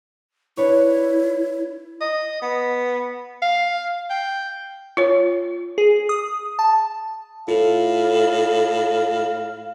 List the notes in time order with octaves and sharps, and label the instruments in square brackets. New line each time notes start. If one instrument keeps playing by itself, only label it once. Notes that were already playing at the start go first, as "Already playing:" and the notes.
[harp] D4 B4 C#5 [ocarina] E4
[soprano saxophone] D#5
B3
F5
G5
[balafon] F4 C#5
[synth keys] G#4
D#6
A5
[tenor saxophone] A2 [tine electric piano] F4 A4 [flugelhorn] F5